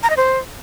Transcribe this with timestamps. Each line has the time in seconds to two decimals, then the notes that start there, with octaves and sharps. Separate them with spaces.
0.03 A#5
0.10 D#5
0.17 C5